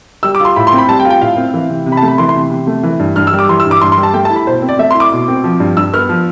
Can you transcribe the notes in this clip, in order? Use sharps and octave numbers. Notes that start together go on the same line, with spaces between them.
G3 E6
D6
F4 C6
A2 B5
C6
C4
B5
G3 A5
G5
F4
G5
A2 F5
C4
E3
C3
C3
B5
A5
A3
B5
E3 C6
C6
C3
C3
A3
E3
G2
G2 F6
E6
G3
D6
E3 C6
E6
G2
D6
G2 C6
C6
G3
A5
A3 G5
A5
E4
B5
B2 C5
C4
D5
A3 E5
C6
E4
D6
B2
C4
F3
G2
G2 E6
B3 F6
F3